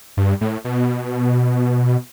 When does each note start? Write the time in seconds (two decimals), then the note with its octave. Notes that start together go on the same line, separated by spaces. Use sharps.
0.17 G2
0.41 A2
0.65 B2